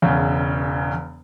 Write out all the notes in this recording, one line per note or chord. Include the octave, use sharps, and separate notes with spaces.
E1 E2 C#3